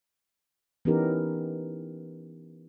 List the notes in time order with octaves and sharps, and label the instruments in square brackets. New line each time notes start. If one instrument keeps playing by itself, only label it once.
[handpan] E3 B3 C#4 D#4 G4 A#4